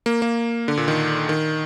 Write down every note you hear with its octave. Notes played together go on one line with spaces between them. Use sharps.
A#3
A#3
D3
A#2
D#3
D#3